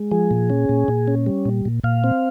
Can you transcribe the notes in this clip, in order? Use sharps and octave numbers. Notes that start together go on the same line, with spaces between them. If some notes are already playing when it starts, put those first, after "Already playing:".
Already playing: G#3
F3 G#4
A#2
C#4
A#2
A#2
C#4
G3
A#2
A#2
A#2 F5
C4